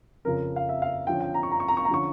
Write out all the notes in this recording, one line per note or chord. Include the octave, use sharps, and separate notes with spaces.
F2 C#3 F3 A#4
F5
E5
F5
D3 F3 C#4 G5
G5
A#5
C#6
A#5
C#6
A#5
C#6
A#5
D3 F3 C#4 C#6